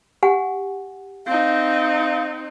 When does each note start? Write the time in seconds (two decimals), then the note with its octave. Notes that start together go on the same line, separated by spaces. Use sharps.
0.23 G4 F#5 G#5
1.27 C4 D#4 F5